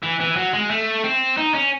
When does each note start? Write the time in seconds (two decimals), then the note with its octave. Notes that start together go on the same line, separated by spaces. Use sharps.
0.03 E3
0.20 E3
0.36 F#3
0.53 G#3
0.70 A3
1.04 C4
1.38 D#4
1.55 C#4